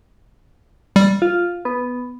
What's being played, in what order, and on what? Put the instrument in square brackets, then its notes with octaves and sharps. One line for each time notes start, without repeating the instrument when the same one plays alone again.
[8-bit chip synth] G3
[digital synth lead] F4
B3